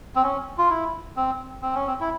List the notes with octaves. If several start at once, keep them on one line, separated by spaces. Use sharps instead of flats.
C4
C#4
F4
E4
C4
C4
C#4
C4
E4